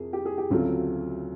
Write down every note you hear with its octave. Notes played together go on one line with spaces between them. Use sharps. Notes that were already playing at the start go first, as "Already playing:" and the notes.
Already playing: F2 C3 G#4 A#4
G4
G#4
G4
D2 C#3 F#3 A3 C4 F4